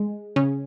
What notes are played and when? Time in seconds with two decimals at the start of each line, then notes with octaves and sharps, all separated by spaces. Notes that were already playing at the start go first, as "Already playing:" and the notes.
Already playing: G#3
0.36 C#3 C#4